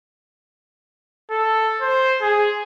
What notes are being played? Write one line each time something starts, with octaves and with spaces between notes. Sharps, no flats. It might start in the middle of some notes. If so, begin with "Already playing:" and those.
A4
C5
G#4